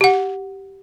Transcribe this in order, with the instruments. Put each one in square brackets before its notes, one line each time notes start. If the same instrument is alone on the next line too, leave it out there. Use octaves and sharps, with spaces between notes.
[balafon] G4 F#5